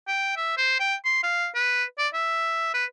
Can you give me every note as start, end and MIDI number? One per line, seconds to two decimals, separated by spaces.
0.08 0.36 79
0.37 0.54 76
0.57 0.75 72
0.80 0.95 79
1.05 1.22 84
1.23 1.48 77
1.55 1.84 71
1.98 2.08 74
2.14 2.70 76
2.74 2.85 71